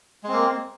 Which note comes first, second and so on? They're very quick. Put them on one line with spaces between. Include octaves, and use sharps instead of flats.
G#3 C4 A#3